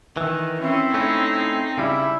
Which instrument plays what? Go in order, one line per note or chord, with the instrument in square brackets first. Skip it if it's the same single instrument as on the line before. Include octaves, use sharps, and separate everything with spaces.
[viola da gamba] D#3 [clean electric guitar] E3
[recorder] C4 [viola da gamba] C#4 [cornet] E4
[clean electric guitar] A3 C#4 [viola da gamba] D#4
[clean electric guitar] C#3 G3 [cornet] E4